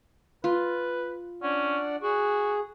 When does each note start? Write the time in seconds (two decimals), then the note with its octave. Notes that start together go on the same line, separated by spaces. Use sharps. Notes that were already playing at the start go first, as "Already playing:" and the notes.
0.44 F4 B4
1.43 C#4 D4 D5 F#5
2.03 F#4 G#4